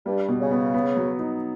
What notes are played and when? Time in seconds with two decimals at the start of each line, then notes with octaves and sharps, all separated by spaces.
0.06 G2 G3
0.28 B2
0.40 C#3
0.51 B3
0.74 B3
0.97 F#3
1.19 D#4